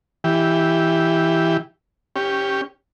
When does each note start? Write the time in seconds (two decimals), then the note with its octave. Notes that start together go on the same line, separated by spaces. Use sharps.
0.24 E3 G4
2.16 C#4 G4